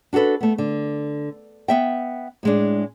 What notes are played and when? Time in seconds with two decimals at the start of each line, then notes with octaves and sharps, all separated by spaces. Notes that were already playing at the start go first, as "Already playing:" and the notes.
0.13 D4 F#4 G4 A4 B4
0.41 A3 B3
0.58 D3
1.68 B3 E5 G5
2.43 A2 G#3 D4